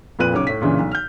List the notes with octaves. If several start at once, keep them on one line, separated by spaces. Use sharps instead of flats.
F2 A#2 F4 B4 F#6 D#7
B1 C#3 C#5 D6
A2 B6
G2 A#2 C#3 E3
B1
F6 G6